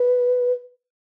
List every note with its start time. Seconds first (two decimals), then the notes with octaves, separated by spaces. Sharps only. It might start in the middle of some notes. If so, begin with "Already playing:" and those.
Already playing: B4